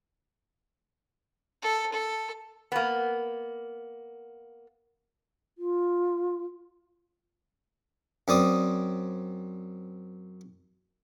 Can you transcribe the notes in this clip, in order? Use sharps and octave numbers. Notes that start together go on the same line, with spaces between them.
A4
A4
A#3 B3
F4
F#2 C4 D5 D#6